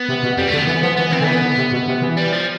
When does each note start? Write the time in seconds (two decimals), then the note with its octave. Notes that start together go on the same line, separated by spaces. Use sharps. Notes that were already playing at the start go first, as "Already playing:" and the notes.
Already playing: B3
0.09 C3
0.23 B2
0.37 F2 G3
0.47 A3
0.53 D3
0.57 B3
0.67 E3 B3
0.83 F3 B3
0.97 E3 B3
1.12 E3 C4
1.21 D3
1.24 E3 B3
1.42 D3
1.57 C3
1.72 B2
1.88 C3
2.02 E3
2.17 G3
2.32 F3